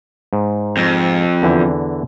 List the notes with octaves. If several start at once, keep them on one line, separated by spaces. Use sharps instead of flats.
G#2
F2
E2 D3 E3